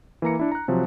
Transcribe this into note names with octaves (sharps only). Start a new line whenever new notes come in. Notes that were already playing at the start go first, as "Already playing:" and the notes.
E3 A#3 A#5 C#7
D4 E4
A#5 F#6
C3 F3 F#3